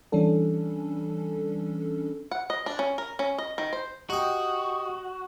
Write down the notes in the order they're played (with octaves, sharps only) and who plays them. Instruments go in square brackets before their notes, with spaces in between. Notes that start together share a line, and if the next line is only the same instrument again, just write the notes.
[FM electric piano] E3 G3 C#4 D4 A4
[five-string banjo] F#5
D#5
D4
C#4
A#4
C#4
D#5
D#3
C5
[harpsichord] D#4 G5 [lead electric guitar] F#4 [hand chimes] G4 D#6